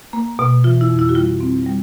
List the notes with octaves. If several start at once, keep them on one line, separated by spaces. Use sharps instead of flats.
A#3
B2
E3 F4
E4
F2
E4
F#4
G3 F4
C4
G3